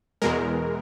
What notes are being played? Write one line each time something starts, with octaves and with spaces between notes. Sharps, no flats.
E2 B2 G#3 A#4